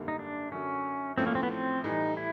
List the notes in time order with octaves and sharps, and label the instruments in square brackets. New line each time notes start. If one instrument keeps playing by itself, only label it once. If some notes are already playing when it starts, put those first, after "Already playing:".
Already playing: [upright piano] G#1 F#2 D3 G3 A#3
[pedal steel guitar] D#4
D4
[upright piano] F#2 D3 F#3 [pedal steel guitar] C#4
[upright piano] A1 A2 F3 A3 C#4 [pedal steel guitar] C4
[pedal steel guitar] A#3
C4
B3
C4
[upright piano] A2 E3 G3 [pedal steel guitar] D#4
[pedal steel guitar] E4